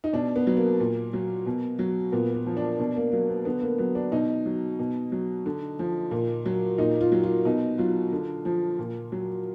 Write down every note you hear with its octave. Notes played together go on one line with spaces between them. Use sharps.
D#4
B2 D4
B3
F#3
A#3
A#2
F#3
B2
F#3
A#2 B3
B3
F3
D4
B2 D4
A#3
F#3 A#3
B3
D3 B3
A#3
F#3 B3
D4
B2 D#4
F#3
B2
F#3
D3
F3
A#2
F#3
A#2 D#4
F4
F#3
F4
B2 D#4
F#3 F4
D3
F3
A#2
F#3